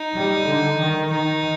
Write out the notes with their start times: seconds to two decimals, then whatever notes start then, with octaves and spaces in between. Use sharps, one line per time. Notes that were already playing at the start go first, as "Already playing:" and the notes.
Already playing: D#4
0.13 G3
0.45 D3
0.78 D#3
1.10 D#3 D#4